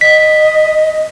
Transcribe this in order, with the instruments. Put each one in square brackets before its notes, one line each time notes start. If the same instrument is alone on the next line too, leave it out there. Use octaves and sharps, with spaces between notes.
[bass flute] D#5 [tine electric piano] B6